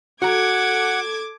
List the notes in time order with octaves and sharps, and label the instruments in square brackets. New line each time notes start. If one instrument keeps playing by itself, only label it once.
[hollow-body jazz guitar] F#4 A#5 [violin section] A4 D6 G#6 [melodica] F#5